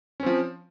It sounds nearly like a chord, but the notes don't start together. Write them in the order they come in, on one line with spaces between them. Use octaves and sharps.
C#4 C4 F3